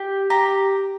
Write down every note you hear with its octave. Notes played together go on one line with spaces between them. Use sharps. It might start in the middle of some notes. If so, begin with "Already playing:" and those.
Already playing: G4
G4 A#5